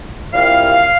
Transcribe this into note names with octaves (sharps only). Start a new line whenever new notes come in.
C2 A#2 G3 F5